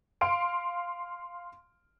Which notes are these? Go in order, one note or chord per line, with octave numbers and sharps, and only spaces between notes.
F5 C6 D7